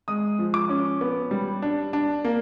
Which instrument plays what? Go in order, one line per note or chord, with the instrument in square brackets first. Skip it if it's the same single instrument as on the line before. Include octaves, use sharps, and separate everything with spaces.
[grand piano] G#3 D#6
F3
D6
C#4
B3
G3
D4
D4
A#3